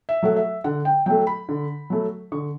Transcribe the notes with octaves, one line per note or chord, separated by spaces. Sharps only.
E5
F#3 A3 F#5
E5
D3 F#5
G5
F#3 A3 G5
B5
D3
F#3 A3
D3 C#6